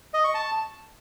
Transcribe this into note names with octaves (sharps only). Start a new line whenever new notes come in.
D#5
C#6
A5